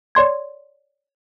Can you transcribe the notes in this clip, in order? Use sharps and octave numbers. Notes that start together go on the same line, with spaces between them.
C#5 D5 C6 G#6